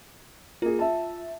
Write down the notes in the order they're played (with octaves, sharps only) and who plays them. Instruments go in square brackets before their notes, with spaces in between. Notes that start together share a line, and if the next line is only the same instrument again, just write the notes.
[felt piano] A#3 G#4 [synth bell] F4
[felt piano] E5 A5